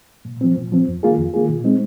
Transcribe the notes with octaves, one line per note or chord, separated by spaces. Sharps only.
A#2
F3 C4
A#2
F3 C4
F2
D#3 A#3 F4 G#4
F2
D#3 A#3 F4 G#4
A#2
G#3 C4 D#4